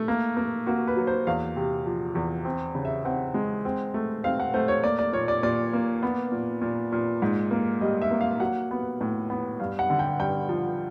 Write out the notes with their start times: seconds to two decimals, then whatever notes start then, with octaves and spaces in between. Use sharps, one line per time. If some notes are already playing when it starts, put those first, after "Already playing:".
Already playing: A3
0.08 A#3
0.37 A#3
0.67 A#3 F#4
0.87 B4
0.96 F#3
1.07 C5
1.27 E2 F5
1.56 C3
1.86 F3
2.15 E2
2.45 C4
2.75 C#3
2.85 E5
3.05 C4 F#5
3.34 G#3
3.65 C4
3.94 A3
4.24 C4 F5
4.40 F#5
4.54 A3 C5
4.68 C#5
4.84 A#3 D5
4.99 D5
5.13 A#2 C#5
5.28 D5
5.43 A#2 D5
5.73 A#3
6.03 B3
6.32 A#2
6.62 A#2
6.92 A#2
7.22 G#2
7.51 A#3
7.81 G3 D#5
8.02 E5
8.11 A#3
8.21 F5
8.40 F#3 F#5
8.71 B3
9.01 A2
9.30 B3
9.60 G2 F5
9.79 F#5
9.90 D3
9.99 G5
10.20 G2 G5
10.49 F3